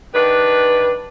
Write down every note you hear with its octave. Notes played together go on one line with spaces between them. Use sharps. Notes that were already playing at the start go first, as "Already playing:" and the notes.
D#3 D4 G4 B4